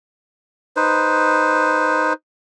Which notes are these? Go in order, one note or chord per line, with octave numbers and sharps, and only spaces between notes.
D#4 B4 C5